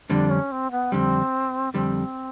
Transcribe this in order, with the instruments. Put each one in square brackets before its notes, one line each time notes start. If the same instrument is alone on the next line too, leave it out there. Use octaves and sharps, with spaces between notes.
[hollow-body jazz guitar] F2 D3 G3 [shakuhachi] D4
[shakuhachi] C#4
C4
B3
[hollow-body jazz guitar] F2 D3 G3 [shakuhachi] C4
[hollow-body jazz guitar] F2 D3 G3 [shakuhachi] C4